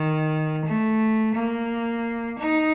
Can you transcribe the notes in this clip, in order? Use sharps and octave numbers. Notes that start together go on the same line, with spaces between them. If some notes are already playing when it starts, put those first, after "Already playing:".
Already playing: D#3
A3
A#3
D#4